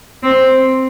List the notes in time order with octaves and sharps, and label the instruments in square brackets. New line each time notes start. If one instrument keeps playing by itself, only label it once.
[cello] C4